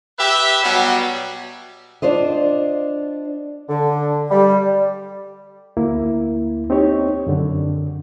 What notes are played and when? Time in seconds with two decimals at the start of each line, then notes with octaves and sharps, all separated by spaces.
0.19 G4 B4 E5
0.63 B2 F#3 G3
2.02 D4 F4 C5 D#5
3.69 D3
4.30 G3
5.77 D2 A#3 E4
6.70 C4 D#4 G4 C#5
7.27 F#2 D3